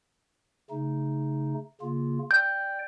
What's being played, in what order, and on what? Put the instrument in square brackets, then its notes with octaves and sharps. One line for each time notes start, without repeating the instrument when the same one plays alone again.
[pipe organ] C#3 A3 D#4
C#3 A#3 F4
[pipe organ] D5 G5 [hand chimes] G6